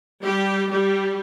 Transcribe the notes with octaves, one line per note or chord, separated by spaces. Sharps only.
G3 G4
G3 G4